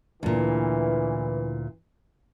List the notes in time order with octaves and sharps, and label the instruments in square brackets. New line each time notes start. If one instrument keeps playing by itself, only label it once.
[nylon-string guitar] D2 A#2 [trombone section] E3